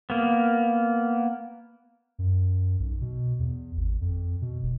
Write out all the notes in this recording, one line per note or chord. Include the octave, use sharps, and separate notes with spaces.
A#3 B3
F#2
B1
B2
E2
G#1
F2
B2
F1